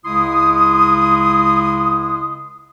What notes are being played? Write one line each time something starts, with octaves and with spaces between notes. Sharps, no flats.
C#2 C#3 G#3 E4 C6 D#6